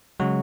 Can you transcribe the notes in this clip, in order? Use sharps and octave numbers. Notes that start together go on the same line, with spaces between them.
C#3 F#3 G#3 F#4